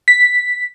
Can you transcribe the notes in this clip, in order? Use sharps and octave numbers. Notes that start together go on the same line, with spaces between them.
B6